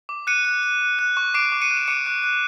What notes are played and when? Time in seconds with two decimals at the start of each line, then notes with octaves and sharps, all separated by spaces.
0.09 D6
0.27 F#6 C#7 D#7
0.45 F#6
0.63 F#6
0.81 F#6
0.99 F#6
1.17 C#6
1.34 D6 C7 D7
1.52 D6
1.62 C#7 D#7
1.71 F#6
1.77 E7
1.88 D6 C#7 D#7
2.06 F#6
2.23 F#6